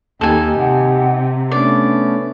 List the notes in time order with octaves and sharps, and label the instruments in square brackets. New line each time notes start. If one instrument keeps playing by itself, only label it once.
[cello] D#2 [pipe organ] D#4 G4 [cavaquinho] A4 G#5
[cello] C3 [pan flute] F#5
[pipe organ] A3 B3 C#4 [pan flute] D4 [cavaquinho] D5